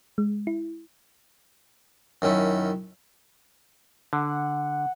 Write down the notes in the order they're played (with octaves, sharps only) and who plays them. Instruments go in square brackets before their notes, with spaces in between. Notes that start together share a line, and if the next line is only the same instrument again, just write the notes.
[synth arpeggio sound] G#3
E4
[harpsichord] F#2 D#3 C#4 E4
[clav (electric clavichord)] D3 [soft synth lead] F#5